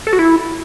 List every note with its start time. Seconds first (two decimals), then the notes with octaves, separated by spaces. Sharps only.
0.07 A4
0.13 F#4
0.19 E4